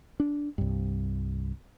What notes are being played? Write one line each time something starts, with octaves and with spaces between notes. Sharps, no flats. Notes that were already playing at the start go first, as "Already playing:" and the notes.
D4
C2 G2